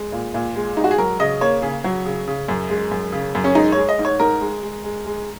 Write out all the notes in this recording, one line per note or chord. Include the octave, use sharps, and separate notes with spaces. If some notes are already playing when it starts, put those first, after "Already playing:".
Already playing: G#3
A#2
A#2
G#3
G#3 D#4
F#4
G#4
F#3 A#4
C#3 D#5
A#3 C#5
C#3 G#4
F#3
C#3
C#3
F#2
G#3
F#2
C#3
F#2
C#4
G#3 D#4
G#3 C#5
D#5
G#2
C#5
G#2 A#4
G#3
G#3
G#3
G#3